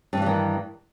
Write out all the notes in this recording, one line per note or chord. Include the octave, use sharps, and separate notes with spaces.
G2 D#3 E3 G3